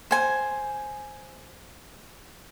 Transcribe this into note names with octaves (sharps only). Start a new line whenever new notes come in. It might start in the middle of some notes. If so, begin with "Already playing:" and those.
C5 G#5